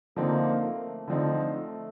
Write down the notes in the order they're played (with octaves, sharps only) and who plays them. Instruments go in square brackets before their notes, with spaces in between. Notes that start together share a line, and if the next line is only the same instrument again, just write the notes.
[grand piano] D3 F3 C4 D#4 [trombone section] A#3
[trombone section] A3
[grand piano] D3 F3 C4 D#4